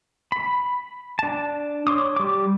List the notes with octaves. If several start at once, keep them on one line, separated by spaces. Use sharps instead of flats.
B5
D4 A5
C#5 C6 D6 D#6
G3 D6